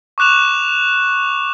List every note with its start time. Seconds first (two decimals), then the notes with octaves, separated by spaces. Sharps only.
0.18 C#6 D6 F#6 E7 F7